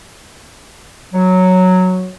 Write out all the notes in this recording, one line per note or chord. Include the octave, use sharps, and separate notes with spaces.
F#3